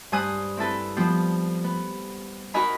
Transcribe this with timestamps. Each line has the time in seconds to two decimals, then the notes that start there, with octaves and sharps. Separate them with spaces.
0.12 G2 C5 G#5 D#6 F#6
0.57 C4 E4 A4 B4
0.97 F3 G3 B3 C5
1.64 B3
2.54 D#4 F#4 A#4 D#5 G#5 B5